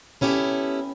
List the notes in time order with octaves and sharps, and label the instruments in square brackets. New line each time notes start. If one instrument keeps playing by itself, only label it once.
[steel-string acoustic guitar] B3 C#4 E4 G4 A4